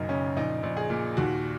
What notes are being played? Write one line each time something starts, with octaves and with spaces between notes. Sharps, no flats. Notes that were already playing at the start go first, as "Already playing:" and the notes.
Already playing: F#1 B1 F#2 D#4
C#3 C#4
A#1 D#4
A#1
G#4
A#2
D#2 F#4